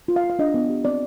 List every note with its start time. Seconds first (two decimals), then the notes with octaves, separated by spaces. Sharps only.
0.08 F4
0.16 F5
0.24 F4
0.30 F5
0.39 D4 D#5
0.54 B3
0.69 G4
0.85 C4 D5